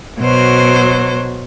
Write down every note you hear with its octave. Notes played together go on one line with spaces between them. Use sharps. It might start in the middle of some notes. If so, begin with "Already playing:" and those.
B2 F#3 C5